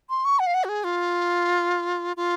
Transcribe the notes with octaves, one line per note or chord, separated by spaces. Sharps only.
C6
C#6
F#5
F5
F#5
F#4
G#4
F4
F4